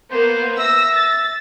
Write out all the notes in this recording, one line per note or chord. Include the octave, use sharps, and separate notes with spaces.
A#3 B3 C5
E5 E6 A#6
A6